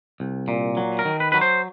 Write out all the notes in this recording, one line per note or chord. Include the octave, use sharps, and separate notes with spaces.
C2
A#2
F#3
A#4
D#3
B4
F#3 B4
C5